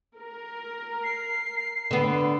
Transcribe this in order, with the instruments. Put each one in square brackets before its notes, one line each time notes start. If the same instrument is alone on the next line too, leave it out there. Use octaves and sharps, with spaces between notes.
[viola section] A#4
[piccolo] C7
[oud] D3 B3